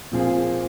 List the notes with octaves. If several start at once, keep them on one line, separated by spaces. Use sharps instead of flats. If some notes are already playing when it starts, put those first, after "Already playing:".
A#2 F3 C4 F4 G#4